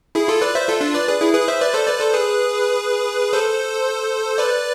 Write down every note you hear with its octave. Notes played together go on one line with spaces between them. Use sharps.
E4 G#4
F4 A4
B4 D5
C5 E5
F4 A4
D4 F4
B4 D5
G#4 B4
E4 G#4
G#4 B4
C5 E5
B4 D5
A4 C5
B4 D5
A4 C5
G#4 B4
A4 C5
B4 D5